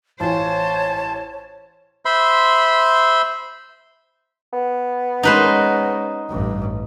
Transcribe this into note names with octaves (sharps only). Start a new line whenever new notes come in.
A1 F4 C5 C#5 G#5 A5
C5 E5 B5 C6
B3
G#3 C#4 D#4 B4 C5
A1 G2